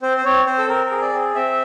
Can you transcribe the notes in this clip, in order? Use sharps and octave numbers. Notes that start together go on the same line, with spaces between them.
C4 C5
C5
C4 C#5
C4 C5
A4
C4 A#4
A#4
G#4
D5
C4
C4 E5